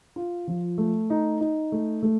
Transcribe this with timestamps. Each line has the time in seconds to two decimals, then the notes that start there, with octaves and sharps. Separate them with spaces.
0.16 F4
0.48 F3
0.78 A3
1.10 D#4
1.41 D#4
1.72 A3
2.03 A3